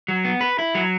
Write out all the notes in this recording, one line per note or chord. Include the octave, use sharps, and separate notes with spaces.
F#3
B3
B4
E4
F#3